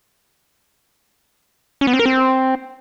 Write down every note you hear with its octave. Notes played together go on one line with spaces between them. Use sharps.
C#4
B3
C4
A#4
C4